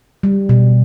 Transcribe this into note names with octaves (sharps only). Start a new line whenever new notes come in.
G3
B2